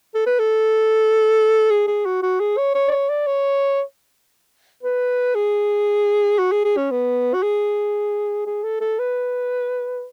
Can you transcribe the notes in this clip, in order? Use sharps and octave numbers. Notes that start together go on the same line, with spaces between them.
A4
B4
A4
G#4
G#4
F#4
F#4
G#4
C#5
C#5
D5
C#5
D5
C#5
B4
G#4
F#4
G#4
G#4
C#4
B3
F#4
G#4
G#4
A4
A4
B4